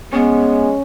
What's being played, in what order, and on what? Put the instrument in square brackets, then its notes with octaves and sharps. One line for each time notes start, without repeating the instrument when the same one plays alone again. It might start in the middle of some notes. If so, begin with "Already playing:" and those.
[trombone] G#3 [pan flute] B3 [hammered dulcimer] C#4